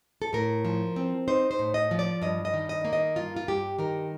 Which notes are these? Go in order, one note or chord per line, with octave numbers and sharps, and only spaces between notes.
A4
A2 A#4
F3
C4
D#4 C5
C5
A2
D#5
F3
D5
G2 D#5
D#5
D#3
D#5
A#3
D#5
G2 F4
F4
G2 G4
D#3 A#4